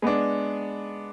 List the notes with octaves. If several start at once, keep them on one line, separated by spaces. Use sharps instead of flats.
G#3 B3 D4